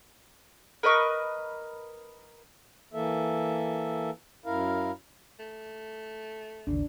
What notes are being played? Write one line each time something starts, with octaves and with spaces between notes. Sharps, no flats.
A#4 B4 D#5 C#6
E3 A#3 A4 E5
F#2 E4 A#4 F5
A3
A1 D#2 C#3 D4